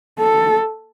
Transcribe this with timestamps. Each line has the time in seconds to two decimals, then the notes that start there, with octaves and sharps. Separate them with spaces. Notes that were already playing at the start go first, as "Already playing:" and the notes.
0.19 A4